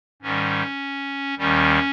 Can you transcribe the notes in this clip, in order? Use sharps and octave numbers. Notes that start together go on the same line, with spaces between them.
G#2 D#3 G3 C#4
D#2 D#3 G3 C#4